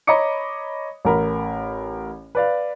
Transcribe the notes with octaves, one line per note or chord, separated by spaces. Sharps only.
C#5 D#5 A#5 B5 D6 C#7
A1 A#4 B5
B4 D5 F5